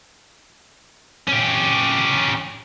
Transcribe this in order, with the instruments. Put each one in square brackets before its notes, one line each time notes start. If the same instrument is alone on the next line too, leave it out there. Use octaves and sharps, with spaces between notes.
[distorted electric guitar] C#4 G4